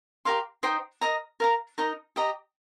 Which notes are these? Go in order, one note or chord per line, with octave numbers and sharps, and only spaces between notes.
G4 A#4 F5 C6
D#4 C5 G5 D#6
A#4 D#5 A#5
A#4 F5 A#5
D#4 A#4 D#5 A#5
G4 D#5 A#5